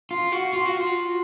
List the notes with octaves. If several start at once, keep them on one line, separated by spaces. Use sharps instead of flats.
F4
F#4
F4
F#4
F4